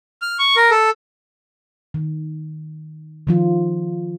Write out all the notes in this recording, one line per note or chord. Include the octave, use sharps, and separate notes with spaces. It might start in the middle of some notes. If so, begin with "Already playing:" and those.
F6
C#6
A#4
A4
D#3
D#3 F3 F4